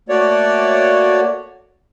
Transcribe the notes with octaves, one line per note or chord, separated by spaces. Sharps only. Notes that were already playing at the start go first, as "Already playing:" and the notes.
A3 A#3 F#4 C#5 D5